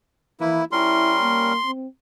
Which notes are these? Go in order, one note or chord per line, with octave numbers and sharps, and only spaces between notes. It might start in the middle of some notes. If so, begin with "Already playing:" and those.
E3 A#3 E4 B4
G3 C#4 E4 A#4 C6
A#3
C4